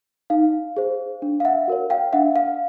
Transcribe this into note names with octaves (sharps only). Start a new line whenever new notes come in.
D#4 F5
G#4 C5
D4
F5
E5 F#5
F#4 A#4 C#5
F5 G5
D4 E5 F#5
F5